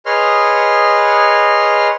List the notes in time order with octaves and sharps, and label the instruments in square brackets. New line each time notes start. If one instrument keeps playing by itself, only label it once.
[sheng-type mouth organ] G#4 B4 C#5 D#5 C6 F6